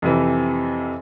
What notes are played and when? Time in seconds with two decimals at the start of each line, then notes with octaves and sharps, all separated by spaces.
0.02 F2 C3 E3